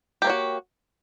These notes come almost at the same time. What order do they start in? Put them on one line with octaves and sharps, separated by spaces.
G4 A#3 C#5 F#4